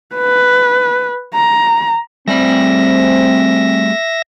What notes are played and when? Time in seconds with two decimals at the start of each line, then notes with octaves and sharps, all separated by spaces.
0.15 B4
1.34 A#5
2.28 G3 A3 C4 D5 E5 A#6